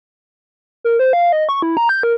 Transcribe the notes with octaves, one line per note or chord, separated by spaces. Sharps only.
A#4
C5
F5
D#5
C#6
E4
A#5
G6
A#4